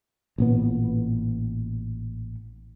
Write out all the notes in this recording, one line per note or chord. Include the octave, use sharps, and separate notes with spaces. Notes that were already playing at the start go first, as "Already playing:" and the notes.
A1 A#2 B3